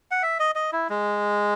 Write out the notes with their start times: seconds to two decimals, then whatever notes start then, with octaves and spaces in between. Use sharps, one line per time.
0.11 F#5
0.22 E5
0.39 D#5
0.55 D#5
0.72 E4
0.90 G#3